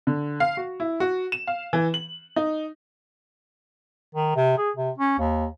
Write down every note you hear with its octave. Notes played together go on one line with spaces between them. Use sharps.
D3
F5
F#4
E4
F#4
E7
F5
E3
F#7
D#4
D#3
C3
G#4
C3
C#4
D#2